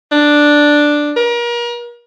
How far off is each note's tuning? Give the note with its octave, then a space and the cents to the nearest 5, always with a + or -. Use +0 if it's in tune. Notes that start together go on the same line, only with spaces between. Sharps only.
D4 +5
A#4 +35